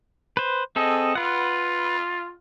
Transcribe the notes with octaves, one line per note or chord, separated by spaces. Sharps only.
B4 C5
C4 G#4 A4 D#5
F4 B4 F#5